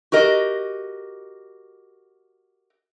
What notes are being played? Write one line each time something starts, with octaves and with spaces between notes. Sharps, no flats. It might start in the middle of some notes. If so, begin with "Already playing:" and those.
F#4 G4 A#4 D#5